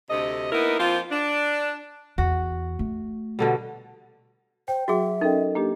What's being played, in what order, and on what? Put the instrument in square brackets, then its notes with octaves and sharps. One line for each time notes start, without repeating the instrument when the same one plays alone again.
[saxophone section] D2 C3 A4 D#5
A#3 B3 D#4 E4 A#4
F3 A#3 C4 F4
D4
[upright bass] E2 [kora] F#4
[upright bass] A3
[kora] B2 D3 G3
[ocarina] C5 [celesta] G5
[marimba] F#3 [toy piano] F#4 G#4 [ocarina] E5
[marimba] C#4 A4 G5 [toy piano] D#4 [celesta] A#4 D#5
[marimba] A#3 D4 G4